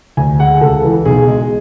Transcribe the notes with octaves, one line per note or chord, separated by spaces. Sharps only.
D2 G#5
G#3 F#5
C#2 A4
E3
B1 G#4
G#3